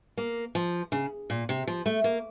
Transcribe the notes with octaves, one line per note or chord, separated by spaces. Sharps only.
A#3
F3
C#3
A#2
C3
F3
A3
A#3